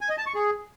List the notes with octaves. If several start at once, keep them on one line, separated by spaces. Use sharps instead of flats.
G#5
D#5
A5
C#6
G#4